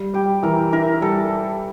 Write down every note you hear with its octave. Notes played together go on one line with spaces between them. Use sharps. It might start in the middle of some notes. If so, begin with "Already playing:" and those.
Already playing: G3
G3 G4
E3 A#4
E4 A#4
G3 A4